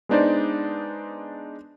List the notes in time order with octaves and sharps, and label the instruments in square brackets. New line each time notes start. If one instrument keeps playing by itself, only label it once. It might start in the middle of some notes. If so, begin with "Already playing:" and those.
[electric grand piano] G#3 B3 D4 D#4 C5 D5